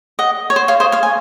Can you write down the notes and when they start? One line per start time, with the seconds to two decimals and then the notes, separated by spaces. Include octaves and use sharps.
0.19 D#5 F#5
0.50 C#5
0.56 C5
0.68 C#5 F5
0.80 C5 D#5
0.92 C#5 F5
1.03 G#5